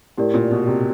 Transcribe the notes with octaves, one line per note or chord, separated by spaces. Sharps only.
A2 E4 G4 A#4 D5
A#2
B2
C3